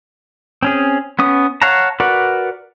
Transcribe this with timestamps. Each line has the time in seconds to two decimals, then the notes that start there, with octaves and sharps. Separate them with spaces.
0.63 C4 C#4 G#4
1.19 B3 C#4 D#6
1.62 C#5 F5 F#5 A5 A#5
2.00 F#4 A#4 B4 D5 F#5